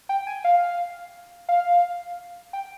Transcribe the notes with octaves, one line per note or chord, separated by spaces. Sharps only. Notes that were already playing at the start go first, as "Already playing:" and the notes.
G5
G#5
F5
F5
G5